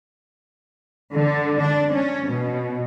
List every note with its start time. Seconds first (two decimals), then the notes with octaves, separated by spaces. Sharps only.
1.15 D3
1.60 D4
1.94 C#4
2.27 B2